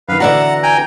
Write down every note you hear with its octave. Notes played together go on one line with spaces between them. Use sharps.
F#2 D#3 B4 F5
D3 E3 B3 F#4 D5 E5 F#5 A#5
G5 G#5 A#5